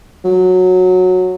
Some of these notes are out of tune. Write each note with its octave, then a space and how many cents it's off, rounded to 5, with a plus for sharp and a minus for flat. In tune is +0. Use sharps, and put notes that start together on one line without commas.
F#3 -15